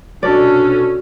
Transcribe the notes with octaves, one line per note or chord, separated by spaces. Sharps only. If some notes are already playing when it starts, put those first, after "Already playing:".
C2 B2 C#4 D4 F#4 A4 D5